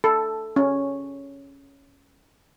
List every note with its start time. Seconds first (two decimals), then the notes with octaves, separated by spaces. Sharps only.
0.04 A4
0.56 C#4